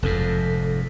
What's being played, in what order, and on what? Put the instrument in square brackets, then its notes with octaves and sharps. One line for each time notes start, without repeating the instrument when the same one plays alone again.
[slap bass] F1 F2 G#2 [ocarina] A4